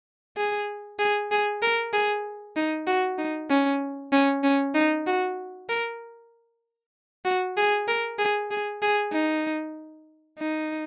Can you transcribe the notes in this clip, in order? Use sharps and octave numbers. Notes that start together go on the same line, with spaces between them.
G#4
G#4
G#4
A#4
G#4
D#4
F#4
D#4
C#4
C#4
C#4
D#4
F#4
A#4
F#4
G#4
A#4
G#4
G#4
G#4
D#4
D#4